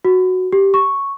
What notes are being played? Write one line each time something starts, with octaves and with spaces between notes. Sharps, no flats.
F#4
G4
C#6